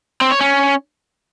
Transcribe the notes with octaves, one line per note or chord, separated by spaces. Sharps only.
C4
C#5
C#4